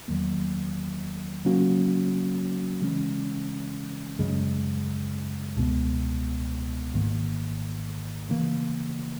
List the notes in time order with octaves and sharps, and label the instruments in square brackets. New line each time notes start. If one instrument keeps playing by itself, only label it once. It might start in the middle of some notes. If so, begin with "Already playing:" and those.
[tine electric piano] E2 D#3 F#3 A#3
C#3 F#3 A#3 C#4 F#4
C#3 E3 G#3 C#4
F#2 C#3 G#3
C#2 B2 G#3 B3
G#1 G#2 D#3 A#3
C#3 E3 A#3